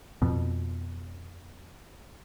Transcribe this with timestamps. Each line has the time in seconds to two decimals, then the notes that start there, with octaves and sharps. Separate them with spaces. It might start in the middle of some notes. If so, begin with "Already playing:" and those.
0.22 F2 B2